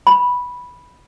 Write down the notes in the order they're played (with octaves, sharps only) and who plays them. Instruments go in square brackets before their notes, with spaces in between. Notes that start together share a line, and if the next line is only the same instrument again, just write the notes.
[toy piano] B5